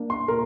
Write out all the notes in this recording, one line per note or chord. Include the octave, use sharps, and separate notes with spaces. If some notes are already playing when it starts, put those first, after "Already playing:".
Already playing: A#3 D4
C6
A#2 A#3 A#4